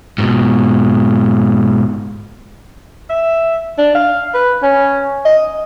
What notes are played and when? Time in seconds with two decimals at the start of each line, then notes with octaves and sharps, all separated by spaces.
0.18 G#2 B2
3.10 E5
3.78 D4
3.95 F5
4.34 B4
4.63 C#4
5.25 D#5